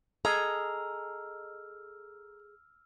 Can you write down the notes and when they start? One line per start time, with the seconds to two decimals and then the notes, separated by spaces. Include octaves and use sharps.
0.25 G#4 A4 D#5 A#5 E6 F6